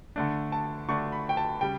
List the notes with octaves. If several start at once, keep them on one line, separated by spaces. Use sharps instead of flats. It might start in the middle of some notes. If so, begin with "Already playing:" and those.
D3 A3 D4
A5
D3 A3 D4 C#6
B5
G5
A5
C#3 G3 G5